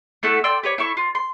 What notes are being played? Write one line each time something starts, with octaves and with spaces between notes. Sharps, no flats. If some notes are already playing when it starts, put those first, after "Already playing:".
A3 E4 F#4 A4
D5 G5 C6 E6
G4 B4 C#5
E4 A4 C#6
F4
C6